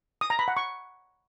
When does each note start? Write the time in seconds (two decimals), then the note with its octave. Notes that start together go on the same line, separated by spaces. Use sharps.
0.21 D#6
0.30 A#5
0.39 B5
0.48 F#5
0.57 C#6